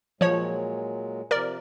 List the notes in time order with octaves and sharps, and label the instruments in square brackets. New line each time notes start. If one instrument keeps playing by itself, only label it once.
[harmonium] A#2 F#3 G#3 [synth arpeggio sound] F3 C#5
[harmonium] C3 F3 [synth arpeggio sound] A#4 D5